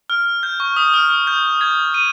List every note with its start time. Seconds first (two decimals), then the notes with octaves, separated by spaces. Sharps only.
0.10 F6
0.43 G6
0.60 C#6
0.76 D#6
0.94 F6
1.10 F6
1.27 G6
1.61 G#6
1.94 D#7